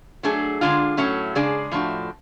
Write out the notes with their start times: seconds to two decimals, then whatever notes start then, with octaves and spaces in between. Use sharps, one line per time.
0.23 F#3 A3 D4 G#4
0.61 D3 G#3 D4 F4
0.97 A2 F#3 A3 C#4
1.35 C#3 G#3 D4 G#4 D5
1.72 A2 F3 A3 D4 F#4